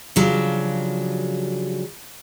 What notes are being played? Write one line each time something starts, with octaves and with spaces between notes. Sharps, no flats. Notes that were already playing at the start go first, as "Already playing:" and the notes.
C#3 F3 F#3 D4 G4